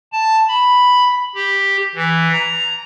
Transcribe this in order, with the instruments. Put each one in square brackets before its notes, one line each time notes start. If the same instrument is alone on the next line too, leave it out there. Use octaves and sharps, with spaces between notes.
[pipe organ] A5
B5
G4
E3
A#5